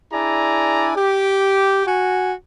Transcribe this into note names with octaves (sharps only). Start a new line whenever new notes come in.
D4 E4 G#4 D5 G#5 A#5
G4
F#4 G#5